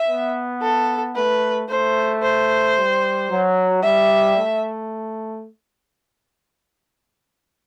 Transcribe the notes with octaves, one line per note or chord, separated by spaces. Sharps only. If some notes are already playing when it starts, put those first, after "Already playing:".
Already playing: E5
B3
A4
A3 B4
A3 C5
C5
G3
F#3
G3 E5
A3